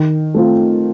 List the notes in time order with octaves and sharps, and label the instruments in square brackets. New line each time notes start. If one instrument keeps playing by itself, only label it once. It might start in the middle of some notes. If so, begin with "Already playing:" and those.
Already playing: [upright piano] D#3
A3 C4 F4